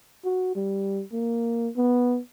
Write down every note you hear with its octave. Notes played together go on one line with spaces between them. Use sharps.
F#4
G3
A#3
B3